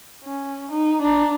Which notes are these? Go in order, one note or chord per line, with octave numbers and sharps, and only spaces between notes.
C#4
D#4
D4 A#5